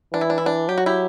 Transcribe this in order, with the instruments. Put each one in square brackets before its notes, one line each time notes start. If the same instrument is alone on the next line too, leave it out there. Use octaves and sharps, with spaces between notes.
[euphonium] E3 [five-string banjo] D4
[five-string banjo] E4
D4
E4
D4
[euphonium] F#3 [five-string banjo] G4
[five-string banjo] F#4
E4 G4